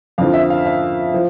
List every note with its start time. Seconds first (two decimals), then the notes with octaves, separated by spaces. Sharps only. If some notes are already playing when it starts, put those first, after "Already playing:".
0.18 F2 D3 F3 F5
0.34 E5
0.50 F5
0.65 F5
1.14 F3